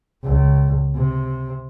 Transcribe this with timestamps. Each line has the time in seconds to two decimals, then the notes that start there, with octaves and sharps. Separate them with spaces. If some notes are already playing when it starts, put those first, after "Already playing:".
0.23 C#2
0.95 C3